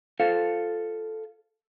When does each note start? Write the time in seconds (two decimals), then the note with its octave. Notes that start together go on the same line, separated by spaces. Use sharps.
0.20 F4 A4 C5 F5